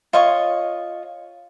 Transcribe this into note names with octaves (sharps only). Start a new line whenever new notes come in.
F4 C#5 D#5 C#6